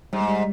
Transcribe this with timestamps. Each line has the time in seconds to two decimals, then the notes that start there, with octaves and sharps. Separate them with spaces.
0.13 G#2 G3
0.21 G#3
0.28 G3